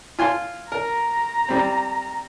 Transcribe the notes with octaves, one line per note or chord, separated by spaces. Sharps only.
F4 G#5 C6
A#4 A#5
G3 C4